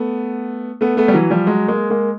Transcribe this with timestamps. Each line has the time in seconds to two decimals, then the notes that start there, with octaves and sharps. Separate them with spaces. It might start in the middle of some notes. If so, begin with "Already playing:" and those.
Already playing: A3 B3
0.81 A3 B3
0.97 A3 B3
1.08 G3
1.14 E3 F#3
1.30 F3 G3
1.47 F#3 G#3
1.68 G#3 A#3
1.90 G#3 A#3